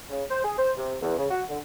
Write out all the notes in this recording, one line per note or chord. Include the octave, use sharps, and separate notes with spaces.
C#3
C5
G#4
C5
C3
E2
C#3
F#4
D3